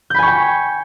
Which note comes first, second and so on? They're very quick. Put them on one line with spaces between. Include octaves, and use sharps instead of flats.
G6 B5 G#5 C#6 G5